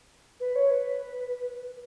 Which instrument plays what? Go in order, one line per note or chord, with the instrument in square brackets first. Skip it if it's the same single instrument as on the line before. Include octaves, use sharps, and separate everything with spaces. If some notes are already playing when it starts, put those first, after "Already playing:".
[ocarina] B4
C#5
B4